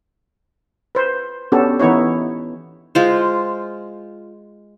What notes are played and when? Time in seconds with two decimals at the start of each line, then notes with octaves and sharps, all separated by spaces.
0.95 B4 C5
1.52 B3 C#4 D4 F#4 G4 A4
1.79 E3 B3 D#4 E4 C#5
2.95 G#3 F4 C5